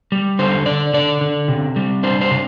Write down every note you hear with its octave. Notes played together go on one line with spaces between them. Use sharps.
G3
D3 C5
D3 D5
D3 D5
D3
C3
G3
D4 C5
C5
C3